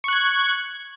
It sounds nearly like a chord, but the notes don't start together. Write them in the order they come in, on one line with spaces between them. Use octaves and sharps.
C#6 F#6 G#6